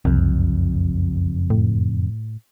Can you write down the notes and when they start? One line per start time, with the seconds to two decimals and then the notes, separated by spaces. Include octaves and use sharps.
0.05 F#1 C2 F2
1.50 A2